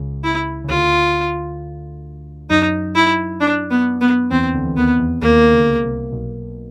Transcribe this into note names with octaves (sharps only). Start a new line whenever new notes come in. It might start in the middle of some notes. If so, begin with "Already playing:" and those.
Already playing: C#2 C#3
E4
C#3
D2 D3 F4
F#2 F#3 D#4
E4
D4
B3
B3
E2 E3 C4
D2 D3
E3
D#2 D#3 B3
E2 E3
D#2 D#3 A#3
C#3
D3
C#2 C#3
C2 C3
B1 B2